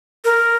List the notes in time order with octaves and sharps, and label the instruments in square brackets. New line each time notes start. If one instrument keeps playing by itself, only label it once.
[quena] A#4